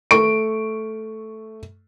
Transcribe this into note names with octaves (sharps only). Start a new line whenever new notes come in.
A3 C#6 D7